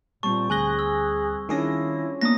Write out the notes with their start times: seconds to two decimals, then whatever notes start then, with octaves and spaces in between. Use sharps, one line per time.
0.23 A#2 G3 C4 A5 C#6
0.50 D2 G#4 G#5 F#6 A#6 G7
0.79 E6
1.49 D#3 C#4 D4 E4 F4 G#4 A#6
2.21 A#3 B3 D4 D#4 D#6 A#6